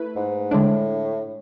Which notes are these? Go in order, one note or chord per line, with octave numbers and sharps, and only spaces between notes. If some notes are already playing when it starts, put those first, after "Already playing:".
Already playing: A3 E4 B4
G#2
A2 D3 G#3 D4